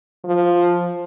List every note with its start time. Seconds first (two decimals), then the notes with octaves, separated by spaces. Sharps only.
0.25 F3